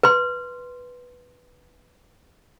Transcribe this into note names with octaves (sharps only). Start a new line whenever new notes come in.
B4 C6